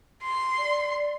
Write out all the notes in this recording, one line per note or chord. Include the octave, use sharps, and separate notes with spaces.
C6
D5